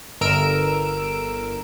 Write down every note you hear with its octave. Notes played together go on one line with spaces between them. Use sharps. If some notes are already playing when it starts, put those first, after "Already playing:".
G1 A#4 E6 D7